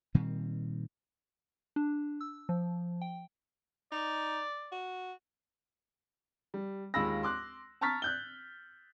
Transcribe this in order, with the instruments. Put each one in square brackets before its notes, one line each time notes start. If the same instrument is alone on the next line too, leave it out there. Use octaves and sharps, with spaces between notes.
[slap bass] A#2 D#3 G3 C4
[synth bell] D4
E6
F3
G5
[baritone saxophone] D#4 [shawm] D5
[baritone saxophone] F#4
[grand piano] G3
D#2 G#3 F4 B5 E6 A#6
C6 D6 F#6
A5 A#5 C#6 F6 A6 B6
F#6 G6 G7